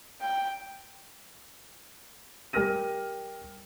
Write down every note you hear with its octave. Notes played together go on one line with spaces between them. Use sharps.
G5
G3 G4 A#4 F6 A#6 D#7